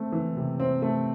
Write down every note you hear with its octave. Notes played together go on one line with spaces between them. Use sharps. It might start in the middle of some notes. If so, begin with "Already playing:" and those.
Already playing: A3 C4
E3
C3
C4
A3